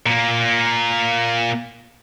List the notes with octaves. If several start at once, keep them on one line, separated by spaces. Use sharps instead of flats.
A#2 A#3